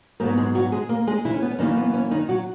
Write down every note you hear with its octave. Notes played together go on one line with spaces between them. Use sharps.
G#2 F#3 A#3 B3 A#4
G#3 G#4
F#3 F#4
G#3 G#4
A#3 A#4
G#3 G#4
E3 E4
C#4
B3
C#4
F#2 D#3 E3 A#3 D#4
B3
C#4
D#3 D#4
F#3 F#4